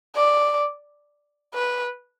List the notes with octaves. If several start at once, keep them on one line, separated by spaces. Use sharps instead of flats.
D5
B4